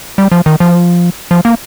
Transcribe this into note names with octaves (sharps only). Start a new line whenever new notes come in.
G3
F3
D#3
F3
F3
A#3